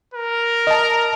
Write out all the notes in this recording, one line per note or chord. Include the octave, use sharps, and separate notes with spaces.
A#4
D#5 A5